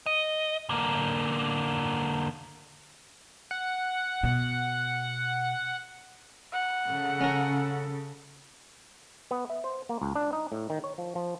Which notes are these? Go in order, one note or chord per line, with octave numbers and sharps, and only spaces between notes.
D#5
D3 A#3
F#5
B2
F#5
C#3 A4
C#4 A#4
B3
E5
C5
A#3
C#2
D4
D#4
A2
D#3
C#5
F3
F3